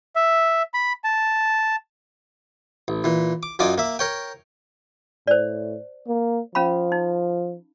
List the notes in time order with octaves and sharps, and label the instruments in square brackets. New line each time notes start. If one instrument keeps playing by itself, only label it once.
[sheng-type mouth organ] E5
B5
A5
[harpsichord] A1
A#2 E3
D6
F#2 D#4 F4 D5 G#5 D6
A#3 E5
A#4 C#5 G5
[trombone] A2 [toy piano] C5 D5
[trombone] A#3
[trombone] F3 [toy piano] C#4 F5 B5
[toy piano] D#4